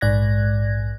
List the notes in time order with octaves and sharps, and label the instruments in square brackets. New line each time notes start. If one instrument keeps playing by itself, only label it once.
[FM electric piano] A#1 G#2 D5 F#6 G#6 A#6